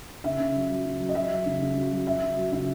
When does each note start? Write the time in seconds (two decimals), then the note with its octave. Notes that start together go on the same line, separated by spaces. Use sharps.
0.24 C#3 E5
0.39 C#3
0.55 F#3
0.70 F#3
0.85 C#3
1.00 F#3
1.09 D#5
1.15 F#3 E5
1.31 F#3
1.46 C#3
1.61 C#3
1.76 F#3
1.92 F#3
2.06 F#3 E5
2.21 C#3
2.37 F#3
2.52 C#3 E5